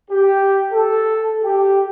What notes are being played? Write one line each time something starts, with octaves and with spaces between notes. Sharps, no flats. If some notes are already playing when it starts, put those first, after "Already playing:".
G4
A4
G4